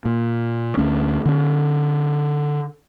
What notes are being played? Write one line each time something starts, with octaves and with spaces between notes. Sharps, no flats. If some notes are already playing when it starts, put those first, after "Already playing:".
A#2
D2 A3 C#4
D3 C#4